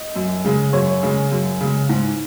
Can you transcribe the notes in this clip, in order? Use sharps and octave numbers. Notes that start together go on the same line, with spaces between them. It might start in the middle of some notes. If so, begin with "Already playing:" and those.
Already playing: D#5
F#2
C#3 G#3
F#2 C#5
C#3 G#3
F#2
C#3 G#3
G#2